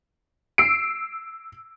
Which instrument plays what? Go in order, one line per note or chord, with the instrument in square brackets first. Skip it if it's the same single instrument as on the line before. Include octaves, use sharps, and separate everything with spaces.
[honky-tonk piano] E6 C7 D7